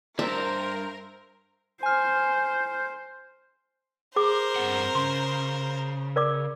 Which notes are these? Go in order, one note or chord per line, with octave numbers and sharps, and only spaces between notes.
G2 A#4 C5 E5
C5 G#5 F6
G#4 A#4 C5 D6
G2 C4 F#5
C#3 C6
A#4 D5 D6